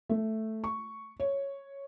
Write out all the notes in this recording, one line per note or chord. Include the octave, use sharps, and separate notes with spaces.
A3
C#6
C#5